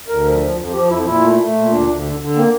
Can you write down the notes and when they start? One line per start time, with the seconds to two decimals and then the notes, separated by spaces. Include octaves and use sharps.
0.08 D2 A#4
0.25 F3
0.40 F3
0.56 F2
0.73 F3 G4
0.89 F2 E4
1.05 A#2 E4
1.22 A3
1.38 A3
1.54 A#2
1.71 D2 D4
1.87 D2
2.04 D3
2.20 D3
2.35 A#3 C4